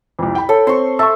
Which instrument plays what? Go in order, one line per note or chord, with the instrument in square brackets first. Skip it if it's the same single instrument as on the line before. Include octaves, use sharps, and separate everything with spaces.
[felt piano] C2 F2
G5 B5
[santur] A4 [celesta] C#5
[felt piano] C4 [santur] C6 C#6
[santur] E5 [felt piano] A5 [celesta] C#6 E6